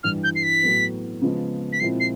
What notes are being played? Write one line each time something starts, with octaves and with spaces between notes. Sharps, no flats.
G2 E3 G3 F6
G6
C7
B6
A2 F#3 B3
C#3 F3 G#3 B3
B6
A#2 F3 G#3 C4 E4 C7
C7